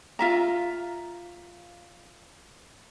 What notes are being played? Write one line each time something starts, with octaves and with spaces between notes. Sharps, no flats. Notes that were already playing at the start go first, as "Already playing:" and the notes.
F4 E5 A#5